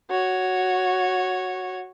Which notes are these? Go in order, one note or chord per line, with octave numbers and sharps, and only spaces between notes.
F#4 C#5